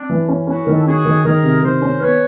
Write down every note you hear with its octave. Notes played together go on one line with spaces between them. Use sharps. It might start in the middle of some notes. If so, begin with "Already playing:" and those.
Already playing: C4 D4
E3
C#4
C#4 E4 F#4
D#3 A#4
A4
C#4 F#4 G#4
D#3
D#3 G#4 A#4
C3
D#3 A#4 C5
C#4
B3 B4 C#5